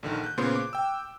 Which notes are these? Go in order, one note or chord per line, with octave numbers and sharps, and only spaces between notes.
A#1 D3 D#3 A#4
F#6 G6
A#2 C#3 B3 C5 C6
D6
G5 E6